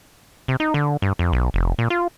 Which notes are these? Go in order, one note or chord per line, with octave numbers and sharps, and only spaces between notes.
C3
D#4
D3
G2
F2
B1
F1
A#2
F4